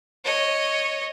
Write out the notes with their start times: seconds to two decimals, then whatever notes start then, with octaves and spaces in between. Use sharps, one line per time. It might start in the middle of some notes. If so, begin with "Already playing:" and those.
0.25 C#5 D#5